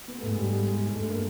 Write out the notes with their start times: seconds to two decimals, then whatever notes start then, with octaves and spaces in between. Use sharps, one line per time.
0.08 B3
0.18 A3
0.23 G#2
0.28 G#3
0.37 G#2 G3
0.52 G#3
0.66 G#3
0.81 G#3
0.95 G2 A3
1.09 A#3